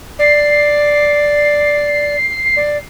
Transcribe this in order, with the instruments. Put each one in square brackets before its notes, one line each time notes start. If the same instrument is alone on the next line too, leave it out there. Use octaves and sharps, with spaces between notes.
[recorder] D5 [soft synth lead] C7
[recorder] D5